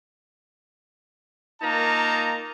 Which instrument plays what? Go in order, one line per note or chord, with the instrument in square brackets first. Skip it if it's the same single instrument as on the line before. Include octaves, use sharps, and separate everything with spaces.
[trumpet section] A#3 D#4 F4 A#4 A5 A#5